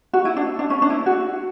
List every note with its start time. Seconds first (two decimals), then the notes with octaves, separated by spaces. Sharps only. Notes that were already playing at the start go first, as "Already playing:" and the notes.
0.13 F#4
0.25 E4
0.37 D4
0.59 D4
0.70 C#4
0.82 D4
0.90 E4
1.06 F#4